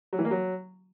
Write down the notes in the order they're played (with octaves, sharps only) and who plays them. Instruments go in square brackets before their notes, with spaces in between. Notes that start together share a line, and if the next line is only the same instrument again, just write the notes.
[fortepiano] F#3
E3
A#3
F#3